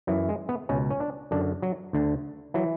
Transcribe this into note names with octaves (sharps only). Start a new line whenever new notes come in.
F#2 E3 F#3
G#3
B3
C#2 B2 C#4
C#4
D4
F#2 D3 D4
F#3
D2 D3
E3 F#3